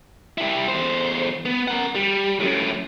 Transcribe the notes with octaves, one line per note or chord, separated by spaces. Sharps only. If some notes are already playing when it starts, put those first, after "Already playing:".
G3 E4
E2 C5
B3
A#4 F#5
G3
F#2 A2